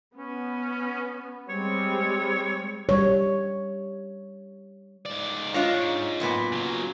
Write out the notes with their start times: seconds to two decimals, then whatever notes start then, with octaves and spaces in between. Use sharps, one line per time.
0.16 B3 C#4
1.49 G3 G#3 C4 C#5
2.89 G3 C#5
5.06 G#2 D5
5.54 D4 F4 C#5 D#5 F5
5.74 G#2
6.20 F#2 A#2 B3
6.52 C#3 F#3